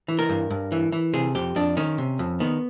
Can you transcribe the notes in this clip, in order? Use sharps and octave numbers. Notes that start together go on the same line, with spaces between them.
E3
A#4
G2
G2
E3
E3
C3 G#4
F2 G4
F2 D4
D#3 C#4
C3
F2
D#3 B3